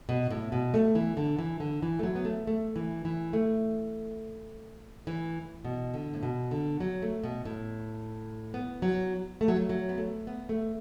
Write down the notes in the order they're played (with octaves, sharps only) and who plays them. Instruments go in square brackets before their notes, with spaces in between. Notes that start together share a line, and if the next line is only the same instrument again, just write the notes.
[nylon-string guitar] B2
A2
B2
A3
E3
D3
E3
D3
E3
A3
F#3
B3
A3
A3
E3
E3
A3
E3
B2
D3
A2
B2
D3
F#3
A3
B2
A2
B3
F#3
A3
F#3
A3
F#3
B3
A3
B3
A3